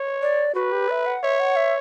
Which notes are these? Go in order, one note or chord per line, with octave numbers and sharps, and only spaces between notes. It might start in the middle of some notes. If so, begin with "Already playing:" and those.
Already playing: C#5
D5
F#4 B4
G4
E5
F#5
C#5 E5
F#5
E5